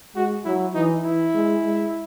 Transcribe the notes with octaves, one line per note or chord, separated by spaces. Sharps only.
G#3 F#4
F#3 E4
E3 D#4
E3 E4
G#3
G#3